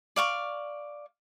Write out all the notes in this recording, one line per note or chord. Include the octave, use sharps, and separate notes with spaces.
D5 F5 C#6